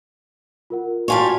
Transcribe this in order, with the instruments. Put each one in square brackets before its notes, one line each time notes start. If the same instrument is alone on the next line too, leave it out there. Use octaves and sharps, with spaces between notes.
[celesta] F4 A#4 F#5
[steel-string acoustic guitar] G3 F4 C#5 [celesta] F#4 G#5 A5